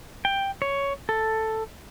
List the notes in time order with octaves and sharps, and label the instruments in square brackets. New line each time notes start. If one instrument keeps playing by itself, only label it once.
[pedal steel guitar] G5
C#5
A4